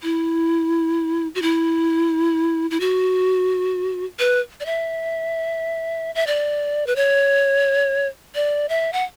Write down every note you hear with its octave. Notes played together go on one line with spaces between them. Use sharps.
E4
F#4
E4
E4
F#4
B4
D5
E5
E5
D5
B4
C#5
D5
E5
F#5